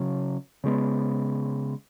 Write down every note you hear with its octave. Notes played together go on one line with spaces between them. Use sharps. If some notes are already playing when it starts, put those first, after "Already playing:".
Already playing: C#3 F#3 C#4
C#3 G#3 B3